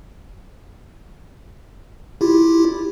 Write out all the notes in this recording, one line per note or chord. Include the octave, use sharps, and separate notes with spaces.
E4 F4 G4